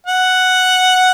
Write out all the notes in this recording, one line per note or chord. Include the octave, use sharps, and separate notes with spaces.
F#5